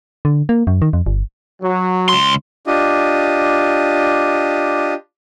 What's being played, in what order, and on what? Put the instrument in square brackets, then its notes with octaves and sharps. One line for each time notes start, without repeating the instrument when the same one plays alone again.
[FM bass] D3
A#3
F#2
D#3
F2
G1
[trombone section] F#3
[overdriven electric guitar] C#2 C6
[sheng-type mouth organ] D4 F4 G4 D#5